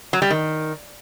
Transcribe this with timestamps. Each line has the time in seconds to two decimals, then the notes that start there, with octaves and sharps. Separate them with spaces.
0.13 F#3
0.22 G3
0.30 D#3